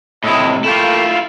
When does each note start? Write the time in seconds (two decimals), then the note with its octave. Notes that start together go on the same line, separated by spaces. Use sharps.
0.24 A2 C3 E4 A4 D#5
0.64 A3 A#3 E4 F4 G5